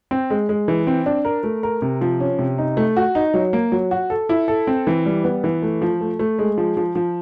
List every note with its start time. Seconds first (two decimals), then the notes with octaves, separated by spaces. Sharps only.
0.11 C4
0.30 G#3
0.49 G#3
0.68 E3
0.87 C4
1.06 D4
1.25 A#4
1.43 A3
1.63 A#4
1.82 C3
2.01 F3
2.20 C#4
2.39 C3
2.58 D#4
2.77 A3
2.97 F#4
3.15 D#4
3.34 F#3
3.53 A#3
3.72 F#3
3.91 F#4
4.10 A4
4.29 E4
4.48 A4
4.67 C4
4.87 E3
5.06 G3
5.24 B3
5.44 E3
5.62 A3
5.82 F3
6.01 A3
6.19 A3
6.39 G#3
6.58 F3
6.77 F3
6.95 F3